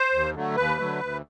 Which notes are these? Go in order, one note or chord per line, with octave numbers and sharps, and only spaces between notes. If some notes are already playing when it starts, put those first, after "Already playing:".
Already playing: C5
D#2
D3 F#3 A3
D#2 B4
D3 F#3 A3
D2